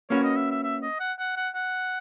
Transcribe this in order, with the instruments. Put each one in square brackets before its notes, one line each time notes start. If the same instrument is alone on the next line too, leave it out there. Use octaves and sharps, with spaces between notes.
[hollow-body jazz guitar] A#3 C#4 F#4 B4 [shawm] C#5
[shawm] D#5
E5
E5
E5
D#5
F#5
F#5
F#5
F#5